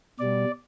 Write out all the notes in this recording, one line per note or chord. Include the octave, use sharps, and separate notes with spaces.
B2 G3 D5